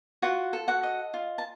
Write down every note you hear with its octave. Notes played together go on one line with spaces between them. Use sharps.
F4 F#4 F#5
A4
F#4 F#5
D#5
F4
A5